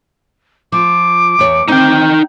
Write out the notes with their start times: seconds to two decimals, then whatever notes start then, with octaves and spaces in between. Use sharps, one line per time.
0.72 F3 D6
1.39 E2 C#5
1.68 C4 D#4 G5